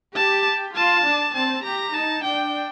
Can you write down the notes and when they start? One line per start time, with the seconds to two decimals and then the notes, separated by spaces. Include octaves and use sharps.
0.16 G4 A5
0.75 F4 A5
1.05 D4
1.35 C4 A5
1.64 G4 A#5
1.94 D#4 A5
2.24 D4 G5